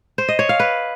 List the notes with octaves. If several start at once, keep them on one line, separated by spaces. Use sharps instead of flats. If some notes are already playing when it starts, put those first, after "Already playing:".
C5
D#5
C#5
F5
B4